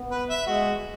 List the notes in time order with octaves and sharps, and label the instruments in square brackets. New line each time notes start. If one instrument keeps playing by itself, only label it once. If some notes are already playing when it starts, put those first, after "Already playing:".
Already playing: [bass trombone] B3
[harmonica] B4
E5
[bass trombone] G#3 [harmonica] F#4